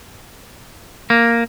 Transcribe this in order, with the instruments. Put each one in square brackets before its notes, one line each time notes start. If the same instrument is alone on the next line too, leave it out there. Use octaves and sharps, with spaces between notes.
[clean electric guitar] A#3